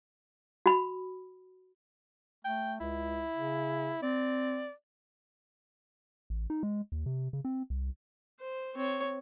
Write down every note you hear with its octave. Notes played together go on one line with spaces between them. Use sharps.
F#4 B5
A3 G5
C#2 E4
C#3
C4 D5
A1
D#4
G#3
D#2
C3
C#3
C4
C2
C5
C4 C#5